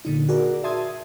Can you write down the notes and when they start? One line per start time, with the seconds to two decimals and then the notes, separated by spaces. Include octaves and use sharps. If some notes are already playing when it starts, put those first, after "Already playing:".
0.05 A#2 D3 D#4
0.29 F#4 G#4 A#4 D5
0.64 E5 A5 C6 D#6 G#6